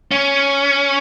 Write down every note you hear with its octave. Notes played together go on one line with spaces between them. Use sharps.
C#4